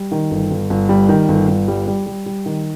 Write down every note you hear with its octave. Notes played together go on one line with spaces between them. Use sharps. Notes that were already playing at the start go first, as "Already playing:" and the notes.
Already playing: G3
D#3
G1
G1
G1
G3
D#3
G1
G1
G3
G3
G3
G3
D#3